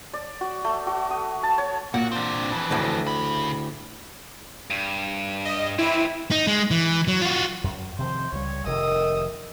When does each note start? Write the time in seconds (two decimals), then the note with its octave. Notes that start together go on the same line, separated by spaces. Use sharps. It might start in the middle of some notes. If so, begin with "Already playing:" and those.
0.14 D5
0.41 F#4
0.65 A3
0.87 F#4
1.11 D#6
1.43 A5
1.58 C#5
1.94 A#2 F#4 F#5
2.12 C4 D4
2.51 F2 E3
2.71 D2 A2
3.07 C#3 B5
4.70 G2
5.45 D#5
5.79 E3 C4 E4
6.31 D#4
6.47 G#3
6.71 E3
7.08 F#3
7.21 F4 F#4
7.64 F#2
7.99 C3 D#3 F3 C5
8.32 C#2 G3 C#5
8.66 F1 C3 D#3 A#4 D#5 D#6 E6